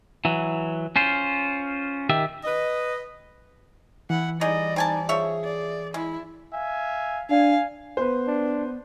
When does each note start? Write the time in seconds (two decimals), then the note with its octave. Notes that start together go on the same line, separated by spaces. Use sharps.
0.25 E3 F#3
0.96 C#4 F4 C5
2.09 D#3 G4 E5
2.44 B4 D#5
4.10 E3 E4 F#5
4.41 G3 D#4 G#4 D5 D#5
4.76 C4 D#4 G#5 A5
5.09 F3 G#4 C#5 E5
5.44 D5
5.94 G#3 E4
6.52 E5 F5 G#5
7.30 D4 F5 G#5
7.97 B3 B4 C5
8.28 D4